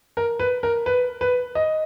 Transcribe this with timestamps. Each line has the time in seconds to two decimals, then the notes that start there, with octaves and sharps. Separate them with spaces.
0.17 A#4
0.39 B4
0.63 A#4
0.86 B4
1.21 B4
1.55 D#5